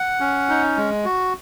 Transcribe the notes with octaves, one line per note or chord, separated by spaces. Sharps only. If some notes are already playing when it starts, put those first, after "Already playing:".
Already playing: F#5
C#4
D#4
G#3
F#4